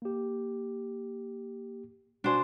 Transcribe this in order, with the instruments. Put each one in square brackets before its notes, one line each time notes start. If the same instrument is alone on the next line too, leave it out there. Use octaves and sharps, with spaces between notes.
[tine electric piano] A#3 G4
[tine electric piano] B2 F#4 G#5 [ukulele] D4 C5